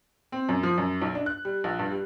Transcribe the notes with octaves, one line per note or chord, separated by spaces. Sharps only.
C4
F#2
F3
F#2
B1
D4
F#6
G3
A#1
G2
G3